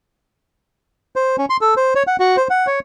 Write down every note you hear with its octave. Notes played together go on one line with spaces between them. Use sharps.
C5
C#4
C6
A4
C5
C#5
F#5
F#4
C5
F#5
C#5